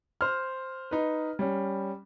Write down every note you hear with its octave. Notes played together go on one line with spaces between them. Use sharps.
C5 F6
D#4 B4
G3 C#4